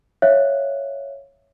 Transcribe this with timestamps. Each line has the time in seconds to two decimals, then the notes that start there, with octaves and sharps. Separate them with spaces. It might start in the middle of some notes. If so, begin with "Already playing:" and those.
0.22 C#5 E5 F5 F#6